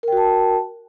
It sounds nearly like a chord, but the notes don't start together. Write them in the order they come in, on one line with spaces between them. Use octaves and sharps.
A#4 G5 F#4 A5